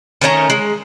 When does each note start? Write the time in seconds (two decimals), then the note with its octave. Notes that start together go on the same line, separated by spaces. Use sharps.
0.21 D#3 A3 C#4 A#5
0.50 G#3